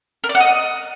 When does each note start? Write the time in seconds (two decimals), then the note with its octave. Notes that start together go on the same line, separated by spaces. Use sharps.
0.24 A#4
0.29 D5
0.35 F#5
0.40 D#5